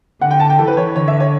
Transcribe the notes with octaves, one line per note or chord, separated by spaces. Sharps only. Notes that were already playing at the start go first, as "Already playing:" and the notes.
D3 F#5
G5
A5
G5
E3 A4
B4
C#5
D3 C#5
E5
C#5